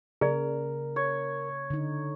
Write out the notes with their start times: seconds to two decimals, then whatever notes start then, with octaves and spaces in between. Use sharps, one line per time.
0.21 C#3 A#3 G#4 A#4 D5
0.96 C#5
1.70 D3 D#4